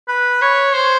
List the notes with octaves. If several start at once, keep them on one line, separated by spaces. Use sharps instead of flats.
B4
C#5
C5